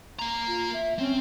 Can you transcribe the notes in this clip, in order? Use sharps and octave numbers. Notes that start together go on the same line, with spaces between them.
A#3 A#5
F4
E5
C4 C#4